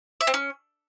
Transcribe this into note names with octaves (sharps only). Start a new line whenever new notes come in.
E5
C4
C#4